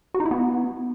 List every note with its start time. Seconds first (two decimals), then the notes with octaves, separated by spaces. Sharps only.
0.14 F#4
0.20 D#4
0.26 E4
0.31 B3